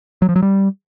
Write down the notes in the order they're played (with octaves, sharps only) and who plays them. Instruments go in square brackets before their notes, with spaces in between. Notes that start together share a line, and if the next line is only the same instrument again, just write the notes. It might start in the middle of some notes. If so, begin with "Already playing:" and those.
[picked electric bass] F#3
F3
F#3
G3